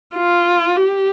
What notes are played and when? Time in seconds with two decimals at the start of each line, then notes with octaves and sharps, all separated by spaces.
0.15 F4
0.76 G4